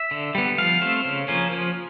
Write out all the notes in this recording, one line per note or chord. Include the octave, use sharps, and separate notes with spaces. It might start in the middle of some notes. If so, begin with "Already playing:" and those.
Already playing: E5
D3
G3 B3
F3 F5
A3 C4
C#3
F3 A#3 C#4
F3